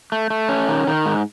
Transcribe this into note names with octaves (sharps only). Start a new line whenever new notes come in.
A3
A3
C#4
D#3
D#3
G#2